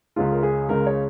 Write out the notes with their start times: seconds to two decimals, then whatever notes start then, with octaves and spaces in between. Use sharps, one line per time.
0.16 C#2 C#3 G#3 F4
0.32 A#4
0.43 G#4
0.68 C#2 C#3 G#3 A#4
0.86 C#5